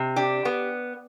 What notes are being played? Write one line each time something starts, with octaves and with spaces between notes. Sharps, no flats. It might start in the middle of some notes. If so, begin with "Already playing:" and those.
Already playing: C3
D4 G4
B3